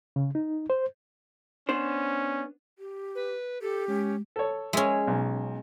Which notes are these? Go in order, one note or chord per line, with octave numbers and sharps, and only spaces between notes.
C#3
D#4
C5
B3 C#4 D4 C5
G4
B4
G4 A4
G#3 C#4
A4 C#5
G#3 C#4 G#4 E5
B1